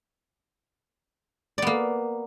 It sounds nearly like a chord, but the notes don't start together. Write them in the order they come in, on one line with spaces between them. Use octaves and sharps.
D5 B3 A#3